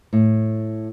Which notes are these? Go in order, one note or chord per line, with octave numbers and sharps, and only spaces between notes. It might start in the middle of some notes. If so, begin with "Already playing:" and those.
A2